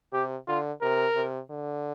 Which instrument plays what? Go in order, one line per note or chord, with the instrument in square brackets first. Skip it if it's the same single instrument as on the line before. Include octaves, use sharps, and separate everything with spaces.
[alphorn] C3 [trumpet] G4
[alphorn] D3 [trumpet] F4
[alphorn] C3 [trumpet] A#4
[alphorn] C3
D3